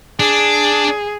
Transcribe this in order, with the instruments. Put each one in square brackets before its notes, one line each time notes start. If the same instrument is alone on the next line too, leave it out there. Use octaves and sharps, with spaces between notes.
[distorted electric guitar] D4 [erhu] G#4